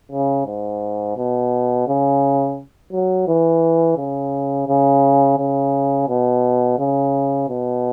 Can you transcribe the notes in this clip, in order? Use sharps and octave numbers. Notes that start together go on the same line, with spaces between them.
C#3
G#2
B2
C#3
F#3
E3
C#3
C#3
C#3
B2
C#3
B2